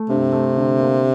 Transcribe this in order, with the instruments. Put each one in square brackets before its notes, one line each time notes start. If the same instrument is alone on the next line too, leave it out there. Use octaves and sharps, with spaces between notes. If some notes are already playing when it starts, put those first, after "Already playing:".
Already playing: [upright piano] A3
[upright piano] G2 [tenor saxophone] C3
[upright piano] A3
D3
A#3